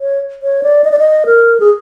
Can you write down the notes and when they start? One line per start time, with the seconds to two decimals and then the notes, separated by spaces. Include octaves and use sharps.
0.01 C#5
0.42 C#5
0.63 D5
0.84 D#5
0.92 D5
0.99 D#5
1.26 A#4
1.60 G#4